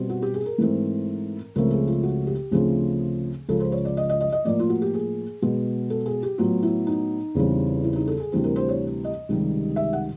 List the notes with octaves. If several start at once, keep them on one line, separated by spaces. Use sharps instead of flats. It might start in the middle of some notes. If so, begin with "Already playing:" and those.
Already playing: B2 G3 C4
F#4
G4
G#4
A#4
G#2 E3 A3 C4
C#2 C#3 F3 A3 C4 A#4
G#4
F4
F#4
G4
D2 C#3 F3 A3 C4 G#4
C#2 C#3 F3 A4
C5
C#5
D5
D#5
D#5
D#5
D#5
A2 F3 A#3 D5
F4
F#4
G4
G#4
B2 G#3 B3
A4
G#4
G4
A2 F#3 B3 F4
E4
D#4
E2 C#3 E3 G3 C4
E4
D#4
A4
G#4
D2 C3 E3 G3 C4
A#4
C5
C#5
D#5
C#2 C3 D#3 G3
E5
F#5